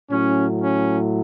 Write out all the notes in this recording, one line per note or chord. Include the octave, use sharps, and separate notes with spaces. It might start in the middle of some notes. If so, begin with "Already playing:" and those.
A2 F#3 C#4
C#4